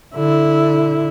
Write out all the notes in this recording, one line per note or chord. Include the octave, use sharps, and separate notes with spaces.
D3 E4